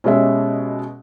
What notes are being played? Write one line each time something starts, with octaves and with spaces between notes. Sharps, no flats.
B2 G#3 C#4 G4 E5